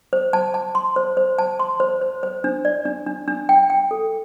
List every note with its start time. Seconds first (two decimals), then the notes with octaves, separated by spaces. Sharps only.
0.13 C5
0.33 A5
0.54 A5
0.75 C6
0.96 C5
1.17 C5
1.39 A5
1.60 C6
1.80 C5
2.01 C5
2.23 C5
2.44 D4
2.65 D5
2.85 D4
3.07 D4
3.28 D4
3.49 G5
3.70 G5
3.91 A4